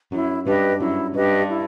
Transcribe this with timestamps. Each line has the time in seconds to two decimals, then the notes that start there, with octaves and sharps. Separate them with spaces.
0.12 F#2 E4
0.46 G2 G4 B4 D#5
0.80 F#2 E4
1.14 G2 G4 B4 D#5
1.48 E4